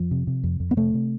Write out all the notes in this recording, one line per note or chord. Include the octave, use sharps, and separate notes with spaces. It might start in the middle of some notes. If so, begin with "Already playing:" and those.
Already playing: F2 F3
C3
C3
F2
F2
B3
C3 A3
C3